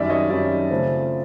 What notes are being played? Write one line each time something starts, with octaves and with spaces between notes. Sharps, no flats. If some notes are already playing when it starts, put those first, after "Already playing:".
Already playing: F#2 D#3 G3 D5 E5
C#5 D#5
F#2 D#3 G3 D5 E5
C#3 F3 A3 C4